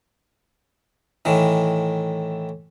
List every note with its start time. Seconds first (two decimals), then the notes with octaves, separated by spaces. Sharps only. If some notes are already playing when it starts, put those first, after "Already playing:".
1.25 A2 D#3 E3